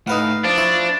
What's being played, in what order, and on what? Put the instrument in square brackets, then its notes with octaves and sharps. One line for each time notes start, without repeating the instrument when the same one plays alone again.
[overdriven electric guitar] A2 [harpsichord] D#4 B4 F#5 [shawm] F5
[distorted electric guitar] D4 [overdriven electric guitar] C5 F5 [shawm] D5
[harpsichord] E4 C#6